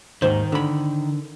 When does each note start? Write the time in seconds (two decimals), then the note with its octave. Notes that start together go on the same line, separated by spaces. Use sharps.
0.22 D#2 G#2 D#3 C5
0.52 D3 B5